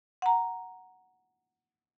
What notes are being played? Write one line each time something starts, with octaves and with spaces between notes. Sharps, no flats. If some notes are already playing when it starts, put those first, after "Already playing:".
F#5 A#5